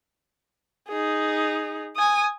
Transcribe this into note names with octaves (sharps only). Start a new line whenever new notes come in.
D#4 G#4
G#5 D#6